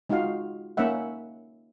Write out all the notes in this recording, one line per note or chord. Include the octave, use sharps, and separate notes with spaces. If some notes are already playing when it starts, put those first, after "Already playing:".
G#3 D#4 F4 F#4 F5
A#3 C#4 D#4 E5 F#5